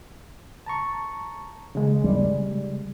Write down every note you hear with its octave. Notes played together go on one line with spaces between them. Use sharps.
A5 A#5 C#6
C#3 G#3
G3